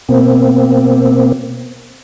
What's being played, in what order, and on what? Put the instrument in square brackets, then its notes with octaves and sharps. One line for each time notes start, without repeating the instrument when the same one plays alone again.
[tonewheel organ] B2 A#3 C4